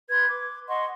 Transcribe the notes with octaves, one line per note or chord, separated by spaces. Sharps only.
B4 C6 G#6
D6
D#5 F#5 C6 C#6